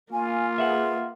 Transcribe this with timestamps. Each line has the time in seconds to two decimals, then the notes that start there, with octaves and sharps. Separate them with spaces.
0.12 A#3 F4 G#5
0.58 G#4 A#4 B4 E5 F#5